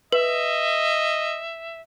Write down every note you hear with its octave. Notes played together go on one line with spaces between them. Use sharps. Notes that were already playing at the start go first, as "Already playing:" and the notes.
B4 D#5 E5